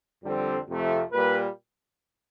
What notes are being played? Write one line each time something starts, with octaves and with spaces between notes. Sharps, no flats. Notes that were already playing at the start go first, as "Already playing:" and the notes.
F2 D3 G3 C4
F2 C3 F3 A3
A#2 G3 A#3 B4